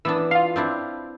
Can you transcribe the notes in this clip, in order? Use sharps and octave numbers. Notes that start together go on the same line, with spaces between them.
E3 B3 D4 E6
F4 F5 C6
C4 D4 E4